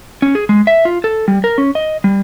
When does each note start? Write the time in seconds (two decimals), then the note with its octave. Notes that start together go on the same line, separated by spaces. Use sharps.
0.22 C#4
0.35 G#4
0.49 G#3
0.67 E5
0.85 F4
1.04 A4
1.28 G3
1.44 A#4
1.58 C#4
1.75 D#5
2.04 G3